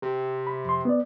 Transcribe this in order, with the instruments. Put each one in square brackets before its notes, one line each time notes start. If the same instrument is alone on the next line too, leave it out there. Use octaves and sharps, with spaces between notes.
[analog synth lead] C3
[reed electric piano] B5
F2 C6
B3 D5